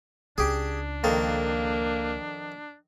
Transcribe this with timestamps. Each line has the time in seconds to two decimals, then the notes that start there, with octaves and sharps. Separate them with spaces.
0.38 C#2 D4 G4 G#4
1.04 F2 D#3 A#3 A4